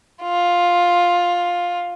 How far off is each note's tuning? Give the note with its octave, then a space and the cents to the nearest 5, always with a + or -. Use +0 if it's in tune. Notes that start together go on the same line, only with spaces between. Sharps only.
F4 +10